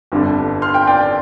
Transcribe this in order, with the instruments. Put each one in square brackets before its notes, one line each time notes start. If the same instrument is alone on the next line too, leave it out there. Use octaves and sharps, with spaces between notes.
[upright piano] G1 F2 D3 G3 D4
C6 F6
G5 C6
D5 G5
D5